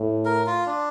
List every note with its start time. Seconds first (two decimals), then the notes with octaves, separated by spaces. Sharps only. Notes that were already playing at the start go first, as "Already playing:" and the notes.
Already playing: A2
0.25 A#4
0.46 F4
0.66 D4